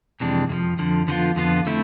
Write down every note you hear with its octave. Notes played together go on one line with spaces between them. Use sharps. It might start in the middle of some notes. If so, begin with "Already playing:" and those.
F2 C3 E3 G#3 D4
F2 D3 F3
F2 D3 F3
F2 D3 F3 B3 F4
F2 D3 F3 B3 F4
D3 A3 C4 E4